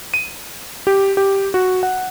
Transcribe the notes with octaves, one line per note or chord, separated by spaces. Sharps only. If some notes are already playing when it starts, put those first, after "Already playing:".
D#7
G4
G4
F#4
F#5